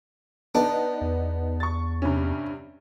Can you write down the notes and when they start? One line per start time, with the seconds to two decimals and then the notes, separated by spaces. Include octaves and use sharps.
0.55 B3 D4 D#4
1.01 E2
1.60 C#6 A6
2.02 G2 C3 C#4